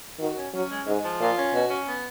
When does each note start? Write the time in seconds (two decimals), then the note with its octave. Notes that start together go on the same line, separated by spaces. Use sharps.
0.19 D#3 F#4
0.37 C#4
0.53 F#3 C#4
0.70 G#3
0.86 G#2 G#3
1.03 F3
1.20 A#2 F4
1.37 C#4
1.53 B2 F#4
1.70 C#4
1.87 B3